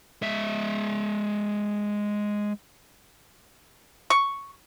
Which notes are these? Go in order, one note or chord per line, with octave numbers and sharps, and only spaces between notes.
G#3 E5
C#6